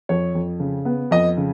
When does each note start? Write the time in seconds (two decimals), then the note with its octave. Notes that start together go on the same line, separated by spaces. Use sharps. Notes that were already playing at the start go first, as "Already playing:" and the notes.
0.09 F2 C#5
0.35 F2
0.60 C#3
0.85 B3
1.11 F2 D#5
1.37 C#3